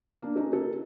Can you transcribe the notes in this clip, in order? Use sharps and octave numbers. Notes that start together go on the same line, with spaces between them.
A#3 D4
C#4 D#4 A4
A4 A#4